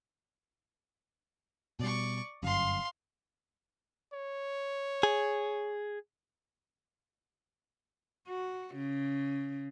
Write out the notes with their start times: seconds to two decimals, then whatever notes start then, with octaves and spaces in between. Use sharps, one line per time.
1.80 B2 G3 D5 C#6
2.43 G1 F#2 F5 C6
4.13 C#5
5.03 G#4
8.28 F#4
8.75 C#3